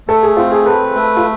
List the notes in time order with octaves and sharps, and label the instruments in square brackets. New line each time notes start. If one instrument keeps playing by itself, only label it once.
[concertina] A3 [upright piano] A4
[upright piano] G#4
[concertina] C4 [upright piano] F4
[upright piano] G#4
[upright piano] A4 [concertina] B4
[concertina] A3
[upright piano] F4